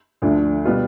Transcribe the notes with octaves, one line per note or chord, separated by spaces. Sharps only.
D2 D3 F3 A3 D4
B2 G3 B3 F4